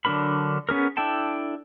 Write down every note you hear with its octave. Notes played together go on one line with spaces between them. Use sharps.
D3 F#3 D4 A#4 B5
B3 C#4 G#4 A#4
D4 E4 A4 G5 A5